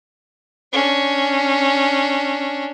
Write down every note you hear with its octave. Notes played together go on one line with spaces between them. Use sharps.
C#4 D4